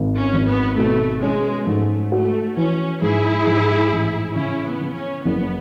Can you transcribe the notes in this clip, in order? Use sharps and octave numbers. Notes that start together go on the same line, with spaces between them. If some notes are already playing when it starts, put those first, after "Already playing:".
Already playing: G#1
C#4
G#1
B3
B2 A3
G#3 C#4
G#2 A3
A3 F#4
E3 C#4
G#2 E4 G#4
G#2
A1
C#3 C#4 E4
B3
C#3
C#4
F#1 B3